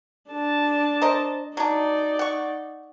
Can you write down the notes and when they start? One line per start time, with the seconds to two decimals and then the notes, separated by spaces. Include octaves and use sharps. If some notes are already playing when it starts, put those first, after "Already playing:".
0.30 D4 A5
1.02 A#4 C5 D#5
1.57 F#3 D4 D#4 D5
2.19 F#5 C#6